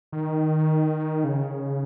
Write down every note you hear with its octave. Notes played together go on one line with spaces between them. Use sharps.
D#3
C#3